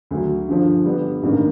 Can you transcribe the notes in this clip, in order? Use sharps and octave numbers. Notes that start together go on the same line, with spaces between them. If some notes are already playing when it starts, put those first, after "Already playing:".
D2 D3 F#3
G2 D3 F3
G2 D3 G3 B3
A1 G2 D#3 G3 A#3